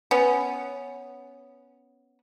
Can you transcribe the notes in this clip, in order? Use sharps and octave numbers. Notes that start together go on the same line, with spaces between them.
B3 C#4